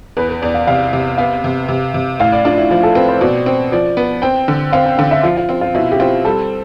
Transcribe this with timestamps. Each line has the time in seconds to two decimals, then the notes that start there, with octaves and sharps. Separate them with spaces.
0.17 E2 B4
0.29 B4
0.42 E2 D5
0.55 F5
0.67 C3 F5
0.93 C3
1.18 B3 F5
1.44 C3
1.68 C3
1.94 C3
2.19 A2 F5
2.32 D5
2.45 D4 F4
2.57 E4
2.70 F3 F4
2.83 A4
2.95 C4 B4
3.09 C5
3.21 B2 D5
3.46 C4
3.72 F3 D5
3.97 B3
4.22 C4 G5
4.48 D3
4.73 C4 F5
4.86 G5
4.98 D3 F5
5.11 E5
5.23 F3 F4
5.37 F4
5.49 C4 F4
5.61 F4
5.75 B2 E4
5.92 G4
6.00 C4 F4
6.25 G3 A4